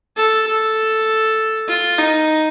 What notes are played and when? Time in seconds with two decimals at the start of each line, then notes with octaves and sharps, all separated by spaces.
0.17 A4
0.47 A4
1.68 F4
1.99 D#4